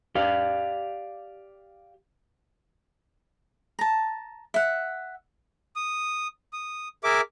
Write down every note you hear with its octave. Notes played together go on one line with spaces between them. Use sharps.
G4 D5 F5
A5 A#5
E5 F#5
D#6
D#6
G#4 A#4 E5 D6